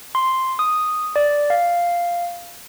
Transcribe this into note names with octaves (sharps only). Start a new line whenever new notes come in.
C6
D#6
D5
F5